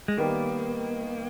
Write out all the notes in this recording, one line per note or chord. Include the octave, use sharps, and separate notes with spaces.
G#3
D#3 G3 A#3 B3 G4 A#4